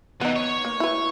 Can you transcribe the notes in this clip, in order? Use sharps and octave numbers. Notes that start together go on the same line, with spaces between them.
D3 E3 B3 D#4
C#5
A#3
E4 B4